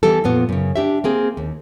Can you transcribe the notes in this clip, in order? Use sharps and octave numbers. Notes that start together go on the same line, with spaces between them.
E3 G3 B3 G4 A4
F2 A#2 B3
F#2 C#3
D4 G4 E5
A#3 C4 G#4
D#2